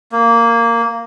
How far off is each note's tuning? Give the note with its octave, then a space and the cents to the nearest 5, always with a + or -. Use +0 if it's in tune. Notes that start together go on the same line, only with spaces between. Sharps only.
A#3 -10